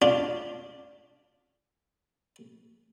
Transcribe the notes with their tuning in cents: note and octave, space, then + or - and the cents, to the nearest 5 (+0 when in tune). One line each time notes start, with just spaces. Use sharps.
D4 +0 F4 +0